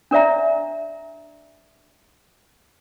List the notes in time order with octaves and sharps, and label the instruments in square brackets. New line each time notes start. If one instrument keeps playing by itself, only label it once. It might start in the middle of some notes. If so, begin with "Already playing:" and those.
[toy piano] D4 A#4 D5 E5 A#5